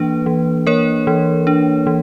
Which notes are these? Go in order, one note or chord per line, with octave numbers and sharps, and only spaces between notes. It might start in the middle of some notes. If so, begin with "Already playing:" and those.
Already playing: E3 A#3 D4 B4
E3
A#3 A#4 C#5
E3
D4
E3